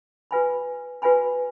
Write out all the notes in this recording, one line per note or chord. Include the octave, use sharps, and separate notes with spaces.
F#4 B4 F5 G#5 B5
F#4 B4 F5 G#5 B5